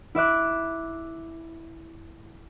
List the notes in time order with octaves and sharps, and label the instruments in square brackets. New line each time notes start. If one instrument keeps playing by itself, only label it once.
[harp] E4 E5 D6 F#6